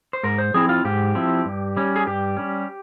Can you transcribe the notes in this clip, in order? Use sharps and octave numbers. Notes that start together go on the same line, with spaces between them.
C5
G#2 A#4
C5
F3 C4 E4 G#4
F4
G#2 G4
F3 C4 E4
G2
G3 C#4
G#4
G2 G4
G3 C#4